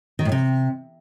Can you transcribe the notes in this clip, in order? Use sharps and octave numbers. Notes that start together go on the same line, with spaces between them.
D#3
A2
C3